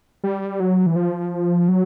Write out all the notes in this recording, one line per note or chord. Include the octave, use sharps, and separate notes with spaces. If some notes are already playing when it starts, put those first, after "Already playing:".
G3
F#3
E3
F3
F#3